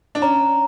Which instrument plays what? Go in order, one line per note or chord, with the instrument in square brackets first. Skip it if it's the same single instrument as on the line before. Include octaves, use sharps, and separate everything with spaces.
[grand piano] D4
[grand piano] C#4 [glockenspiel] A#5